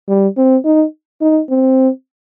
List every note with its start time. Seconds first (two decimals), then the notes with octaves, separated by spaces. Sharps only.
0.08 G3
0.37 C4
0.65 D#4
1.21 D#4
1.49 C4